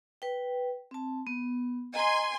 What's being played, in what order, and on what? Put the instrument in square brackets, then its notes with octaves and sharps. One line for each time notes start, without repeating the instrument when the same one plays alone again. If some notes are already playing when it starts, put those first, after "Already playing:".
[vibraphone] B4 G5
C4 A5
B3
[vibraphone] D#5 A#5 [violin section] G#5 C6